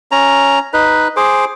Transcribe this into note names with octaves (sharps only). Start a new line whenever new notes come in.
C#4 A#5
D#4 B4
G#4 C5 D6